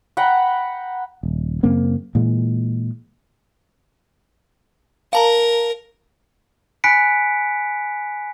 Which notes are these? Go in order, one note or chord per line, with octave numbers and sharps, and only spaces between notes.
F#5 G5 A#5 B5
D#1
F#2 C#3 A#3 C4
A#2 E3 G#3
A#4 F5 A5 A#5
G#5 B5 F#6 B6 C#7 D7